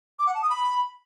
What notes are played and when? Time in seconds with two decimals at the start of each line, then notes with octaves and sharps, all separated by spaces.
0.19 D6
0.27 F#5
0.34 A5
0.42 D#6
0.50 B5